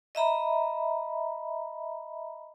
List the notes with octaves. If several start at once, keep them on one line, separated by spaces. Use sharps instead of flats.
D#5 E5 A#5 B5